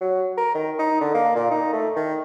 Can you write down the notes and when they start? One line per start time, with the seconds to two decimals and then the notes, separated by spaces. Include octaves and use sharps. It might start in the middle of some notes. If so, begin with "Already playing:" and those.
0.01 F#3
0.38 A#4
0.55 D#3
0.79 D#4
1.01 D3
1.15 A#3
1.36 A#2
1.51 D#4
1.73 A3
1.96 D#3